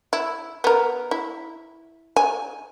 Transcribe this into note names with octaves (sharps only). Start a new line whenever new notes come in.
E4
B3 A#4
E4
G#5